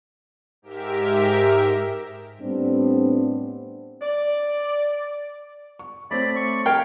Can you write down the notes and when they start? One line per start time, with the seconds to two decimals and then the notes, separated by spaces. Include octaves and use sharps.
0.62 G#2 G4 A#4 E5
2.40 A2 G3 B3 C4 D4
4.01 D5
5.79 C#6
6.11 A3 C4 C#5 D5 B5
6.36 C#6
6.66 A#4 F5 G5 G#6